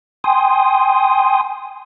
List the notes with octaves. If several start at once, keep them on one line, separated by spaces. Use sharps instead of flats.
G5 G#5 C6 D#6